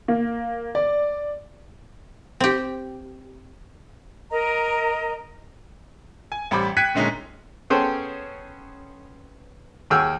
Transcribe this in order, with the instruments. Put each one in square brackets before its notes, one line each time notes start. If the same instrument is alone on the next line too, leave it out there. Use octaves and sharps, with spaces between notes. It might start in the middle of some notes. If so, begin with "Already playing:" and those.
[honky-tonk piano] A#3
D5
[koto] C4 G4
[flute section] A#4 D#5 A#5
[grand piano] G#5
A1 G3 C5 B5 D6
G5 F#6 G#6 B6 C#7 D#7
A#2 D3 G#3 C#4 D#4
[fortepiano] B3 C#4 G#4 A4 C5 G5
D#2 F#4 G#4 G5 E6 F6